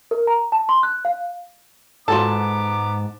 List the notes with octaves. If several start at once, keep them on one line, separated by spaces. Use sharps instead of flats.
A#4
A#5
A5
C6
F#6
F5
G#2 B3 F4 F#4 A4 A5 A#5 D6